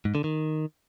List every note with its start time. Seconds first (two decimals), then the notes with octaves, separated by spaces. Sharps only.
0.05 G#2
0.15 D3
0.24 D#3